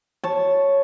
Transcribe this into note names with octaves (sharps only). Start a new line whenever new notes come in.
C#5 A5